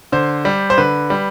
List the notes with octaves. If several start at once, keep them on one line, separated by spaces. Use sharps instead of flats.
D3 C5
G3
C5
D3 B4
G3